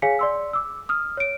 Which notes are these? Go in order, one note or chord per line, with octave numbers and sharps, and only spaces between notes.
G#4 C#5 F5 G#5 B6 C#7
D5 C6 E6
D6 E6
D#6 F6
C#5 D7